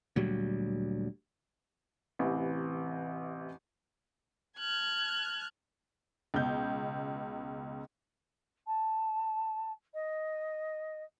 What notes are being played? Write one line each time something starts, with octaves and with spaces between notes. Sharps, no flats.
D2 A#2 F#3 G3
A1 C3 E3
A5 F6 F#6 G#6
C#2 B2 G6
A5
D#5